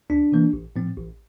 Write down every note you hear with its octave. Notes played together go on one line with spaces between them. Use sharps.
D2 D4
C3 E3 A#3
A1
A2 F3 C4
A1